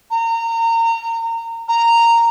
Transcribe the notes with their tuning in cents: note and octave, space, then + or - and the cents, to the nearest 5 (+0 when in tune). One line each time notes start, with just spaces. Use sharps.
A#5 -25
A#5 -10